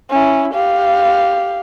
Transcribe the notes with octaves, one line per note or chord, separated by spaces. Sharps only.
C#4 E4
G4 F5